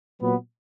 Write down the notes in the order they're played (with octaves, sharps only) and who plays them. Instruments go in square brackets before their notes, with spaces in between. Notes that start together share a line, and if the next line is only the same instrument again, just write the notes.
[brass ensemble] A#2 F#3 B3